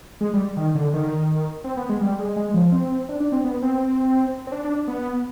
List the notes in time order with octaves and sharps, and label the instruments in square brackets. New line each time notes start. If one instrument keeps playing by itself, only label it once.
[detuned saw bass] G#3
G3
D#3
D3
D#3
C4
B3
G#3
G3
G#3
G#3
F3
C4
D4
D4
C4
B3
C4
C4
D4
D4
B3